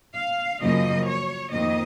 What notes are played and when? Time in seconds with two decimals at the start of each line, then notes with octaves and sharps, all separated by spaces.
0.15 F5
0.60 F#2 C#3 F3 A#3 D#5
1.06 C#5
1.51 F2 D#3 A#3 D#5